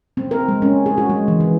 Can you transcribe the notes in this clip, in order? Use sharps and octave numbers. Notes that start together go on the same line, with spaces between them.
C4
A#4
G#3
C#4
G#4
F#4
G#3
E3
E3